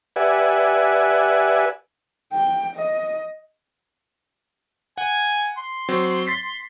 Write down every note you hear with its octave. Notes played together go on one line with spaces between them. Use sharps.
G4 B4 D5 E5 F#5 G#5
G5
D#5
F#5 G#5
C6
F#3 C4
A6 B6 C7